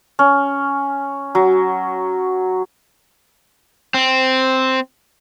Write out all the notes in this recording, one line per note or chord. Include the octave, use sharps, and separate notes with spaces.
C#4
F#3
C4